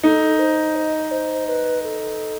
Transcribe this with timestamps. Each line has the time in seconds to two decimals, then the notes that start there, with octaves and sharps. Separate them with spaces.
0.03 D#4 A4
0.39 C5
0.75 D#5
1.11 C5
1.47 B4
1.83 A4